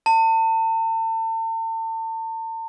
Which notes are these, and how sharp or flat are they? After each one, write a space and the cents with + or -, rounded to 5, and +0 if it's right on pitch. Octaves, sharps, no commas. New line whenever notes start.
A5 +40